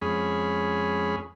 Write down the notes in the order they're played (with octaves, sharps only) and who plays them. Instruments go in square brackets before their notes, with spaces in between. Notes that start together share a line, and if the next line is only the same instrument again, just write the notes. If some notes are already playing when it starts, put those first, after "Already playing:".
[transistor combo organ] F2 G#3 C#4 G#4 B5